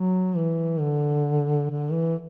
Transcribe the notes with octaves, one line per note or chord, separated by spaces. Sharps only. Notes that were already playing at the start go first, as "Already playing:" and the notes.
Already playing: F#3
E3
D3
D3
E3